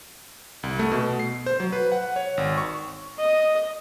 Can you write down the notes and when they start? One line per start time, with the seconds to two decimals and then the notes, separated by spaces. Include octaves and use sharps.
0.63 C2
0.79 A3
0.92 B2
1.19 C7
1.46 C5
1.60 F#3
1.72 B4
1.92 F#5
2.16 C#5
2.37 G#1
2.58 C#6
3.19 D#5